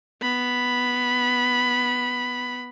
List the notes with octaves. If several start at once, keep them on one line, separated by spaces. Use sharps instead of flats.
B3 B5